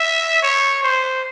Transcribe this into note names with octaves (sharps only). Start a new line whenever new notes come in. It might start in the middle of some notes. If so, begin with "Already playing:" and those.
Already playing: E5
C#5
C5